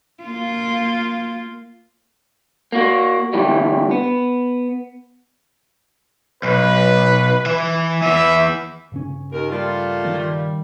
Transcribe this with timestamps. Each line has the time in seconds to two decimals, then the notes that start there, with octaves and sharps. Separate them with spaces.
0.23 A#3 F4
2.72 A#3 F#4
3.33 D2 G2 E3 G3
3.91 B3
6.43 B1 B4
7.46 E3 E5
8.02 E3 B3 E5
8.92 G2 C#3 C#4
9.32 D#2 D#3 A#4
9.50 G3 A3 A#3 F4
10.05 D#3